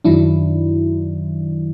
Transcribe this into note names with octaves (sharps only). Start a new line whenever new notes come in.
F#2 D#3 F#3 D4 E4